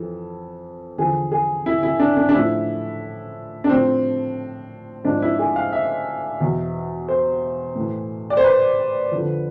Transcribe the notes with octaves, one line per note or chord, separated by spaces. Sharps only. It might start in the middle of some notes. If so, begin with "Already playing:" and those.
Already playing: F2 E3 A4
E2 D3 F3 G#4
G#4
E4
E4
D4
D4
D4
A2 F3 E4
D4
A2 F3 C4
G#2 F3 D4
E4
G#4
F5
E5
E2 B2
C5
A2 E3
D5
C5
B4
F2 D3 F3